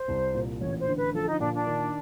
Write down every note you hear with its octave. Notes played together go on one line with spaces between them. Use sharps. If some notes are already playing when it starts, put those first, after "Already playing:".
Already playing: C5
C2
A#2
A1 C#5
C5
D3
B4
F3 A4
D#4
A#2 D4
D4
D#3